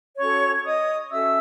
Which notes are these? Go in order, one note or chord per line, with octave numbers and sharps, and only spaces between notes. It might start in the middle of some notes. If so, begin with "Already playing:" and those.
C#4 F#4 A4 C#5 C#6
D#5 D#6
C#4 F#4 A4 E5 E6